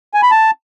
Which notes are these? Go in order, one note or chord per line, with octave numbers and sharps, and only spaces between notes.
G#5
B5
A5